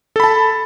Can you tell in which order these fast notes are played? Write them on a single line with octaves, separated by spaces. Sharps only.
A4 B5 A5